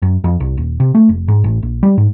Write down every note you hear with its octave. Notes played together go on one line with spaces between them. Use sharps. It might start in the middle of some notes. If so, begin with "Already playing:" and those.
F#2
F2
C2
D#1
C3
A3
F1
G#2
A1
A#1
G3
G#2